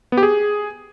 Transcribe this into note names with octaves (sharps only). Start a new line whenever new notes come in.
B3
G4
G#4